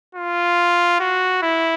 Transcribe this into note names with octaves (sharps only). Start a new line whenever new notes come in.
F4
F#4
E4